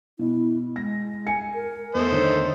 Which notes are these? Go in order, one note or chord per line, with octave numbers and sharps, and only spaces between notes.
B2 E4
G#3 A#6
G#5 C#7
A#4
E2 A3 C5 D#5
D3 D#3 A#4 C#5